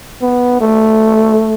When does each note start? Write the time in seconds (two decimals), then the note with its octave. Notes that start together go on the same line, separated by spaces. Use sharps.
0.22 B3
0.61 A3